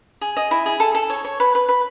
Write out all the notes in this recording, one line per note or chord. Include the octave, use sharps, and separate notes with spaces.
G#4
D#5
E4
G#4
A4
A4
C#5
C#5
B4
B4
B4